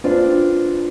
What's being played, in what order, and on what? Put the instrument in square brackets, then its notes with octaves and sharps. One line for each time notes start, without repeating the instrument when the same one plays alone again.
[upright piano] C4 D4 F4 B4 D5